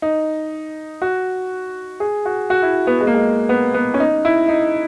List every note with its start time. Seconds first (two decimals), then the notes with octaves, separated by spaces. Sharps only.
0.02 D#4
1.02 F#4
2.00 G#4
2.25 F#4
2.50 F#4
2.62 E4
2.87 B3
3.01 G#3
3.07 A#3
3.14 G#3
3.49 B3
3.74 B3
3.94 C#4
4.00 D#4
4.25 E4
4.48 D#4